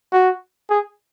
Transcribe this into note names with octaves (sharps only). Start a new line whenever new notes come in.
F#4
G#4